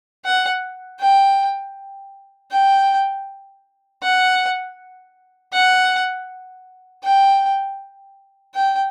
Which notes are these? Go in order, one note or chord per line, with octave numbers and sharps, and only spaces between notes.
F#5
G5
G5
F#5
F#5
G5
G5